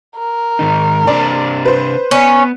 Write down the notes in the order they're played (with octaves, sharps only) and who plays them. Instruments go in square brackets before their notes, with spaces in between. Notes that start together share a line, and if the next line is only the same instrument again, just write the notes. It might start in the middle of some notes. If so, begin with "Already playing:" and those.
[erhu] A#4
[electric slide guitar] G#2 D#3 D#4
[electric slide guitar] C3 C4 D4 [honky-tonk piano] D5
[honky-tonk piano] B4 C5
[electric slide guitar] B3 [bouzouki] C#4